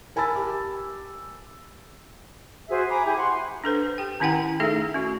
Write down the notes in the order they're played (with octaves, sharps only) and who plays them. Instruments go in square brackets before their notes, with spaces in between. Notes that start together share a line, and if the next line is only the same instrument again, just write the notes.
[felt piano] A#4 G#5 A5 B5 E6 A6
G4
[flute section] F#4 G#4 C5 E5
G#5 A#5 B5 D6
E4 G4 G#4 G#5
F#5 C6 C#6
[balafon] D4 A4 B4 C5
G4 G5
D#3 C#4 E4 F#5 G5 A#5
A3 D#4 G#4 A4 E5
C#4 F#4